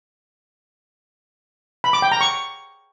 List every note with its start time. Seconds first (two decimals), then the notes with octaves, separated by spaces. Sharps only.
1.84 B5
1.93 D6
2.02 G5
2.12 A#5
2.21 C#6